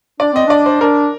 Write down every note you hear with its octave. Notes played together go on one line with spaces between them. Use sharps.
D4 D5
C4 D#5
D4 D5
C5
D4 A#4